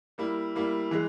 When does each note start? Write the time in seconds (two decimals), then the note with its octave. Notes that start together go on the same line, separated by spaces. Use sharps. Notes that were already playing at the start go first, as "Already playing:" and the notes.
0.18 G3 A#3 E4
0.56 G3 A#3 E4
0.91 E3 G#3